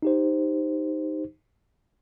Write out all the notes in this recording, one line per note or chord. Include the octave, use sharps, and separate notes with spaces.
D#4 G4 C5